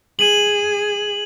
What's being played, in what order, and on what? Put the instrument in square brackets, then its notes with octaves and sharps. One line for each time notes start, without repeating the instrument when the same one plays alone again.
[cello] G#4 [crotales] D#7 F#7